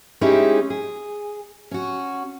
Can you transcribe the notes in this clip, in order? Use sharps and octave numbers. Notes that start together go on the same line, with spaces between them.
G#3 C#4 D#4 E4 G4 G#4
G#4
C#4 F#4